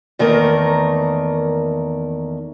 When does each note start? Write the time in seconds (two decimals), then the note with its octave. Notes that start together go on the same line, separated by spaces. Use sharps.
0.19 E2 D#3 A3 A#3 A#4